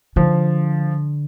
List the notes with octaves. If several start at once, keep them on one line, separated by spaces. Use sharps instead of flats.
D3 F3